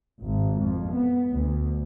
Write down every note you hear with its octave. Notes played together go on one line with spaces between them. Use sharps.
G#1
F2
B3
D2